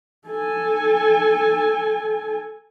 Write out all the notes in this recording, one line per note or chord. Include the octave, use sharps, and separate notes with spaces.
A4 G#5